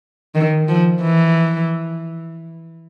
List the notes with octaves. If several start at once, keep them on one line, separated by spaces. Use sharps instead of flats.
D#3
F3
E3